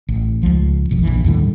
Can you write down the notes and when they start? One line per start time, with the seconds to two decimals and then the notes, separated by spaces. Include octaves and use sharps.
0.09 A1
0.43 C#2 F3
0.89 F1 B1 F2
1.03 A#1 E3
1.24 D#2 A2 D3 G3